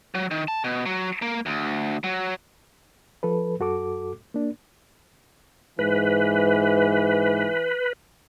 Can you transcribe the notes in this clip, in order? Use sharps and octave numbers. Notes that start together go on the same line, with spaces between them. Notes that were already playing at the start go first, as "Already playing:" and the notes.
F#3
D#3
A5
B2
F#3
A#3
D2
F#3
F3 A4 B4
F#2 F#4 A4 D6
A#3 D4
G#2 E3 B4